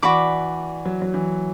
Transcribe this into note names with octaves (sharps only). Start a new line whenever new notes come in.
E3 F#4 D5 B5 D6
F#3
F#3
E3